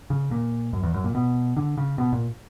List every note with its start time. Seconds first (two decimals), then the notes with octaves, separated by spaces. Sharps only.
0.10 C#3
0.31 A#2
0.73 F#2
0.83 E2
0.94 F#2
1.04 A#2
1.15 B2
1.57 D3
1.78 C#3
1.98 B2
2.12 A#2